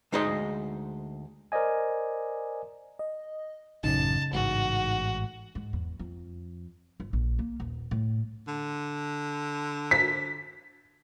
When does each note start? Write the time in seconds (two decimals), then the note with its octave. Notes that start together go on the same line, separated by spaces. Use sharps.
0.12 D2 G#3 D#4 C5 D#5
1.52 A#4 C5 D5 D#5 G#5
2.99 D#5
3.84 A1 F#2 C#3 D#4 A5
4.33 A1 G#2 F#4
5.55 G#2
5.73 E2
5.99 F2
7.00 G1
7.13 A#1
7.39 A#3
7.60 D#1
7.91 A2
8.47 D3
9.91 B6